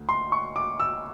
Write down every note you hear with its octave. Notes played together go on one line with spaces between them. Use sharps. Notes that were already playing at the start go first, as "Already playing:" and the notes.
Already playing: D2
C6
C#6
D6
E6